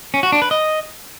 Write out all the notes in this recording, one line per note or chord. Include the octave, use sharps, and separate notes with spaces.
C#4
F#4
D4
B4
D#5